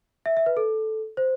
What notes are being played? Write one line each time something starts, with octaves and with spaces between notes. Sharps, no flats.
E5
E5
B4
A4
C5